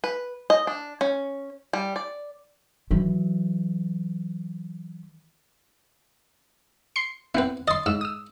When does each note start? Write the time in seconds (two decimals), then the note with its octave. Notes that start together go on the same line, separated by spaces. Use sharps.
0.04 B4
0.50 D#5
0.67 D4
1.01 C#4
1.73 G3
1.96 D5
2.91 E3 F#3
6.96 C6 C7 C#7
7.35 B3 C4 E4 B4
7.68 D#5 C6 D#6 A6
7.86 G#2 E6
8.01 D#6 E6